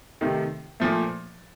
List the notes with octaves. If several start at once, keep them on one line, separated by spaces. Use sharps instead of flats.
C3 D#3 A3 D#4
A#2 F3 A3